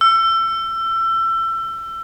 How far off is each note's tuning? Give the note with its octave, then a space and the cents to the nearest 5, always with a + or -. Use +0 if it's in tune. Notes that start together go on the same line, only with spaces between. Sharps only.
E6 +30